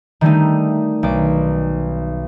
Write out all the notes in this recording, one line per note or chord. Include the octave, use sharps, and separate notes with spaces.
D#3 G3 A3 D#4
B1 D6